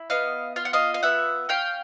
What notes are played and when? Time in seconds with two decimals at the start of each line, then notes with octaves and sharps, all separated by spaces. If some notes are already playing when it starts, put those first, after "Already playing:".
Already playing: E4
0.10 B3 D#5 F5
0.56 F4 F5
0.65 F#5
0.73 D#5 F5
0.94 F5
1.03 B3 E5 F#5
1.49 C#4 F5 G5